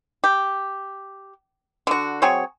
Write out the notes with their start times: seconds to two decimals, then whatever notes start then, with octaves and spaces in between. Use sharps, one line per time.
0.24 G4
1.87 D3 F#4
2.22 F#3 C4 G#4 C#5